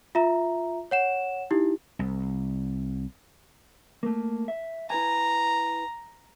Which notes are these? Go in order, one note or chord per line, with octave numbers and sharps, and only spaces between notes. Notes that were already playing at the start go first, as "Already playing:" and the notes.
F4 E5 A#5
C#5 F#5 E7
D#4 E4 G4
C2
A3 A#3
E5
E4 B4 G#5 A#5